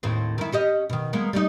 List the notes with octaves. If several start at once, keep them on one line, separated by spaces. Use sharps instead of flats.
D#2 A2 C4
D#3 E4
C#4 G4 D#5
B2 D#3
G#3 A#3 B3
G3 A3 D#4